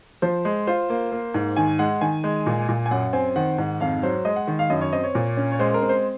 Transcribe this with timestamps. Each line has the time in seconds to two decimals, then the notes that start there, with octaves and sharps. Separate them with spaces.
0.22 F3 C5
0.45 G#3
0.67 F4 C5
0.90 A#3
1.12 A#3
1.34 G#2
1.56 D#3 G#5
1.79 G#3 F#5
2.01 D#3 G#5
2.24 G#3
2.46 A#2
2.69 A#2
2.86 G#5
2.91 F#2 F#5
3.13 C4 G#5
3.36 D#3 F#5
3.58 G#2
3.81 F2 F5
4.03 F#3 C5
4.25 G#3 D#5
4.36 F#5
4.47 D#3
4.59 F5
4.70 F#2 D#5
4.81 C#5
4.92 C4 D#5
5.04 C#5
5.15 A#2
5.37 C#4
5.52 C#5
5.59 G#3 C5
5.74 A#4
5.82 C4
5.89 C5